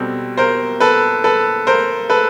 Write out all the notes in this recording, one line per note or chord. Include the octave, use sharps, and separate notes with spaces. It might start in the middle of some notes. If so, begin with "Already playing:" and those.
Already playing: B2 G3 C4 A4
A#4 C5
A4 B4
A4 B4
A#4 C5
A4 B4